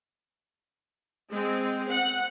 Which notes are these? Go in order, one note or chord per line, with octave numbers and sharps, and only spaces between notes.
G#3 C4
F#5